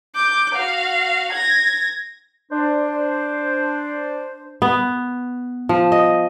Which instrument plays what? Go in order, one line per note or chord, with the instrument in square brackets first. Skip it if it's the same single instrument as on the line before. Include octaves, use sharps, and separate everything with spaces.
[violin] D6 G6
F#4 F5
G#6 A#6
[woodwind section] D4 C5
[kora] B3
F3
D#5